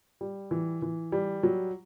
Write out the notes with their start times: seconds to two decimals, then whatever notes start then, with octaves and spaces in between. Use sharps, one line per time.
0.21 G3
0.51 E3
0.82 E3
1.12 G3
1.43 F#3